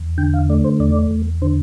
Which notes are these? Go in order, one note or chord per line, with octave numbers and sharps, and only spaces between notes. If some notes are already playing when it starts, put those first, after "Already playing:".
Already playing: E2
D3 G5
F5
A3 D5
C5
E2 D5
E2
D3 C5